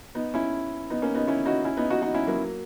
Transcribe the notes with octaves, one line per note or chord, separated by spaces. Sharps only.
B3 D#4
C#4 E4
B3 D#4
A#3 C#4
B3 D#4
C#4 E4
D#4 F#4
C#4 E4
B3 D#4
D#4 F#4
D#4 F#4
C#4 E4
F#3 A#3